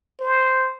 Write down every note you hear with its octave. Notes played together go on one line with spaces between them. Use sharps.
C5